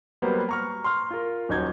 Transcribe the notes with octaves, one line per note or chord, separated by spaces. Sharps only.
F#3 G3 A#3 B3 B4 C5
A#5 C#6 F6
C6 F6
F4 A#4
D#1 F#3 D#4 G6 G#6